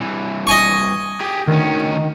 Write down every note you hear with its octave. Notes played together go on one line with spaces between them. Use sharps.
C2 E3
D#5 G#5 C#6
G4 G#4
D2 D#3 C#4